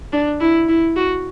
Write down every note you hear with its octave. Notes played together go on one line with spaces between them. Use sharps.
D4
E4
E4
F#4